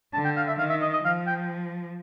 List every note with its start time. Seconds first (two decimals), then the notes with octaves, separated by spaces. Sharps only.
0.14 D3 A5
0.25 G5
0.36 F5
0.48 E5
0.58 D#3 F5
0.70 E5
0.82 D#5
0.93 D#5
1.04 F3 F5
1.27 G5